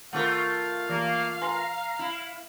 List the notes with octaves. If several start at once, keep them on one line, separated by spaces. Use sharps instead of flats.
D#3 A3 F4 A#4 F5 F#5
E3 A#3
B4 G#5 A#5 C6
E4